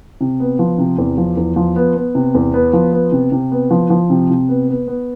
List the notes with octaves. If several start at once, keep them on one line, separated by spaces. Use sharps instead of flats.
C3
B3
F3
C3
E2
F3
E2
F3
B3
B3
C3
E2
B3
F3
B3
C3
C3
B3
F3
F3
C3
C3
B3
B3
B3